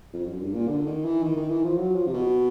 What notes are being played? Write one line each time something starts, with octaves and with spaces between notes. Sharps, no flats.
F2
F#2
G2
A#2
D3
D#3
E3
D#3
D#3
E3
F3
F#3
F3
C3
B2